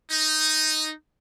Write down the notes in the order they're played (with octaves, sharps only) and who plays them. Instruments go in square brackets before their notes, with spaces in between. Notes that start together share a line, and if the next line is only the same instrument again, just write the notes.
[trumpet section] D#4